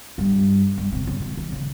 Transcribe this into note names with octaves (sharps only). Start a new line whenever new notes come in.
G2
G2
C3
C#3
D#3
D#3
C#3